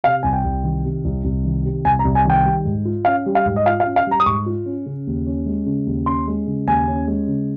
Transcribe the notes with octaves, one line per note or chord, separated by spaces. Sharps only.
C3 F5
C2 G#5
G5
C2
D#3
C3
C2
C2
D#3
C3
C2 G#5
A#5
C2
G#5
D#3 G5
G3
G#2
F4
C#4 F5
G3
F5
G#2
D#5
F4 F5
F5
C#4
F5
G3
A#5
D#6
G#2 C#6
F4
C#4
C#3
D#2
C#4
G#3
C#3
D#2
C#4 C6
G#3
C#3
D#2 G#5
C#4
G#3
C#3